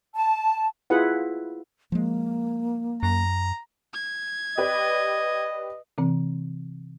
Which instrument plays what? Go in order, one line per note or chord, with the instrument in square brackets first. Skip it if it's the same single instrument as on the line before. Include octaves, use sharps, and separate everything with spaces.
[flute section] A5
[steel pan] E4 F4 G#4 B4 F#5
[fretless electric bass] F3 G#3 [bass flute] A#3
[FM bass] F#2 [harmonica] A#5
[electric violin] G#6
[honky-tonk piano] G4 B4 D5 [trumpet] D#5
[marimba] C3 E3 C4